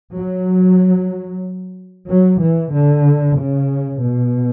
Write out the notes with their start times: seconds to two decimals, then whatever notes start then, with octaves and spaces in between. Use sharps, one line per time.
0.14 F#3
2.07 F#3
2.40 E3
2.71 D3
3.37 C#3
4.01 B2